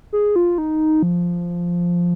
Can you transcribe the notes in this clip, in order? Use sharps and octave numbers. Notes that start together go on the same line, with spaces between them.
G#4
F4
D#4
F3